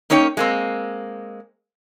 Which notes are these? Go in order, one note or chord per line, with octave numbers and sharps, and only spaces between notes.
A#3 C#4 D#4 C#5 F#5 G5
G#3 A#3 C4